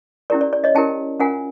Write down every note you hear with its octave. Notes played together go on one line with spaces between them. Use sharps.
C#4 E4 G4 A#4 D5
D5
D5
C#5 D#5
C#4 E4 G4 A#4 G5 A5
C#4 F4 A#4 F#5 G#5